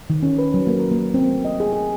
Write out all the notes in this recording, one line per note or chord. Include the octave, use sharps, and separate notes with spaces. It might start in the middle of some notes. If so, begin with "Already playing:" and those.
D#3
C#4
B4
F#3
A#3
A#4
A#3
C4
A3
D#5
G#4
G#4